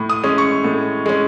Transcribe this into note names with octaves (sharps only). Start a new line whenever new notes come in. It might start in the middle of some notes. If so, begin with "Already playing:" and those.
Already playing: A2
D#6
G#3 C#4
C#6
A2
G#3 C#4